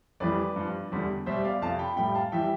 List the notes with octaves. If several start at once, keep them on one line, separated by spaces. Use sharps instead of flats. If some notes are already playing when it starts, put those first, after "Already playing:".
F2 E3 G3 B4 D5
G2 F3
E2 D3 G3
B2 G3 C5 E5
D5 F5
F2 C3 F3 F5 A5
G5 B5
A2 G3 G5 B5
F5 A5
E3 G3 E5 G5